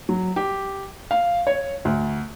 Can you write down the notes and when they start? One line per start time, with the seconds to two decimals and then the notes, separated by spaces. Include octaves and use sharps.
0.09 F#3
0.36 G4
1.11 F5
1.47 C#5
1.85 D2